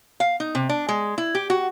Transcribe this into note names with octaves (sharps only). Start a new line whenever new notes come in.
F5
D#4
C3
D4
G#3
E4
G4
F#4